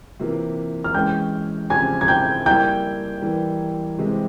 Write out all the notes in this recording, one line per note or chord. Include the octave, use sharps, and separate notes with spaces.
C3 E3 A#3 F4
F6
E3 G#3 C#4 G5 G6
C#3 F3 C4 G4 G#5 G#6
G#6
G5 G6
G3 A#3 E4 G5 G6
E3 G3 A#3
C3 E3 G#3 C4 G4